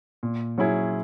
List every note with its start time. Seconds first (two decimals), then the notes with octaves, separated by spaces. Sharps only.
0.23 A#2
0.58 F#3 C#4 E4 G#4